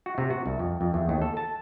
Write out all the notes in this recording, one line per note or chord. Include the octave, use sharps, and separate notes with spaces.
F#4
C3
F#4
C2
F2
F2
E2
D#2
A4
A5